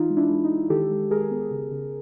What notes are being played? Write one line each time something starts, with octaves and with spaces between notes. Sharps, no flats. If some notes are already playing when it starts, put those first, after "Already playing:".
Already playing: E3 D#4 F4
G#3
D4 E4
G#3
D#4
G#3
D#3 G4 A4
G#3
G#3 G#4 A#4
B3
C#3
C#3